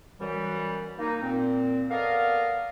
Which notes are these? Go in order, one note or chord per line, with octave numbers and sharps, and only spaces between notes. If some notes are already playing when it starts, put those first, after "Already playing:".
F#2 E3 G3
A#3 D#4
A#2 C4
B3 A4 A#4 D5 D#5 F5